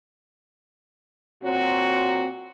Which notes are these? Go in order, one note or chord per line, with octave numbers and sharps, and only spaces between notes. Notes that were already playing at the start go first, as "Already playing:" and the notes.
A#2 F#3 C4 F#4